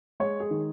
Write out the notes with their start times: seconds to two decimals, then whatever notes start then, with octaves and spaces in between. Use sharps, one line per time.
0.20 G#3 C#5
0.40 G#4
0.51 D#3